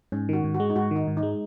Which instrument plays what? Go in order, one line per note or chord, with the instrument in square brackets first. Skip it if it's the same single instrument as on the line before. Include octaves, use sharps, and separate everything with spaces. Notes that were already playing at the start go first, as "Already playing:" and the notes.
[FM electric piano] G#2 [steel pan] C#4
[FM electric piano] D#3 [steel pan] F#4
[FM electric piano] G#2
[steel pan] F#4
[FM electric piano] G#3
[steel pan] D#4
[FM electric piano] G#2 [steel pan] F#4
[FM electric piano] D#3 [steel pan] D#4
[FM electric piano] G#2
[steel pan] D#4
[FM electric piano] G#3